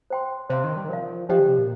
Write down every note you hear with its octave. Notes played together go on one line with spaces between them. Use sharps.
C5 G5 C6
C3 C5 F5 C6
D#3
G3
D#3
F3 A#4 D5 F5
F3 D4 G4 C5 D#5 G5
D3
C3
A#2